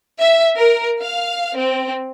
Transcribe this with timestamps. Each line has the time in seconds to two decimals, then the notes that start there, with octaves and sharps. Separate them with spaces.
0.20 E5
0.57 A#4
1.01 F5
1.57 C4